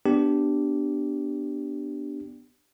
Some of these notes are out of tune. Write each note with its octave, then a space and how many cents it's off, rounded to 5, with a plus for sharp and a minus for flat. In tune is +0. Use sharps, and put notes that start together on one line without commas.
B3 +0 D4 +0 G4 -10